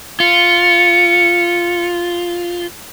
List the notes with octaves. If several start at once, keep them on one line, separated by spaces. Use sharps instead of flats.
F4 C#7